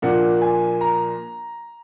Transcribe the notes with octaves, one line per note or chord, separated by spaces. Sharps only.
A#2 F3 A#3 D4 F#5
G#5
A#5